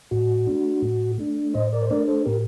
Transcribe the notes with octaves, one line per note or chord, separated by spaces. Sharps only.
A2 F#4
A3 D4
A2
A3 D4
A2 C5 D#5
A#4 D5
C5
A3 D4 A#4 D5
A4 C5
A2 G4 A#4